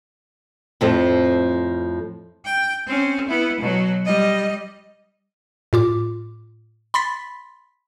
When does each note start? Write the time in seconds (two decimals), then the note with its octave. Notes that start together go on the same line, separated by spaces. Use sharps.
0.81 F2 A2 F3 C4 A4
2.45 G5
2.87 C4 C#4
3.28 B3 E4
3.60 B2 F#3
4.05 G3 D#5
5.73 A2 F4 D6
6.94 B5 C6 A6 B6